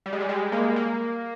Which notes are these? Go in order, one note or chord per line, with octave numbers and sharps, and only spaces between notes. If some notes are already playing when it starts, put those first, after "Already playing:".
G3
G#3
G3
G#3
A#3
A#3